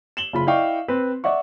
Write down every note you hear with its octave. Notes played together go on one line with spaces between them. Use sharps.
E7 F#7 G7
F#1 F4 B5
E4 D5 D#5 F5 G5 C#6
C4 B4
D5 E5 F#5 C#6